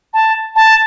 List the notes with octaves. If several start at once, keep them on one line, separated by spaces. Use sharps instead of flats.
A5
A5